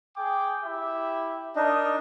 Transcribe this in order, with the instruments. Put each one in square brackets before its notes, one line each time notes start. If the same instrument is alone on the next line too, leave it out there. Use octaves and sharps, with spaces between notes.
[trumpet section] G#4 G5 D6
E4 G4 E5
[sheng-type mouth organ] D4 D#4 [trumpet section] A#4 D#5